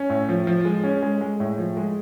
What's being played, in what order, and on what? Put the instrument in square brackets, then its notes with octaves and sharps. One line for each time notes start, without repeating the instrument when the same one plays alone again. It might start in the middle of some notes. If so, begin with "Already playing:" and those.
Already playing: [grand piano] C#4
A2
F3
F3
G#3
C#4
G#3
G#3
A2
F3
G#3